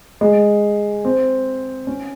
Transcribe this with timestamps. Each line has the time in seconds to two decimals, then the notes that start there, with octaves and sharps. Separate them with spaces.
0.21 G#3
1.05 C4
1.87 C#4